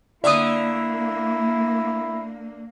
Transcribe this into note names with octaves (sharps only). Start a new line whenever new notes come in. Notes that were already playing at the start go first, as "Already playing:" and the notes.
D3 A#3 E4 D5 E5 D#6